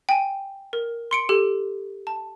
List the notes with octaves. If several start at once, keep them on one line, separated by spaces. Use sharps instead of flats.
G5 G#5
A#4
C6 C#7 D7
G4 A4
A5